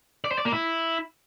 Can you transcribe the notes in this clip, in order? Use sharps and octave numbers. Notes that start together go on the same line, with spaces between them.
D5
C5
D5
A#3
E4